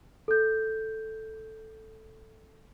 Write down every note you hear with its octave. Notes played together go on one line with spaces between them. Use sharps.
A4 G6